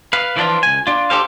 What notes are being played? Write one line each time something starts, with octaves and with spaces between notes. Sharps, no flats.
B4 F5
E3 F3 A#3 D4 F4
C#2 G#5
D4 F4
D4 G4 A4 C5 F5